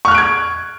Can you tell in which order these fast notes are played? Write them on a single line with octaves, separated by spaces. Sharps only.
C#6 F6 F#6 D7 G#6